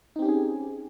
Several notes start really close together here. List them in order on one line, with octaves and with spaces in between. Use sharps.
D#4 C4 G4 C#4 G#4